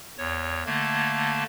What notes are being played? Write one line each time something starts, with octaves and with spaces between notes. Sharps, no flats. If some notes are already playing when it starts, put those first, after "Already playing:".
E2 C#5
D3 A3 A#3 A5 G#6